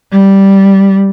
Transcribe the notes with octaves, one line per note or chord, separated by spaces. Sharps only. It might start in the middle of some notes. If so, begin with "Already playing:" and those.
G3